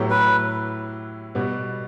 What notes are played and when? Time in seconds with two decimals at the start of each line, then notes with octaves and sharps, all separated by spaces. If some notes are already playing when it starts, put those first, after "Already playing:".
Already playing: A2 F#3 B3 E4 G4
0.10 B4
1.35 B2 G3 B3